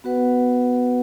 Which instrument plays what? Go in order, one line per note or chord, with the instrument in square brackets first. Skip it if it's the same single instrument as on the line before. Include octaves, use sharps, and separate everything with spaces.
[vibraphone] B3 F#4 B4 F#5